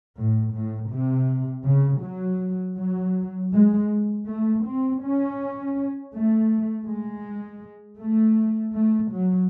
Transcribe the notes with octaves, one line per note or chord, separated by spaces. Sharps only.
A2
A2
C3
C#3
F#3
F#3
G#3
A3
C4
C#4
A3
G#3
A3
A3
F#3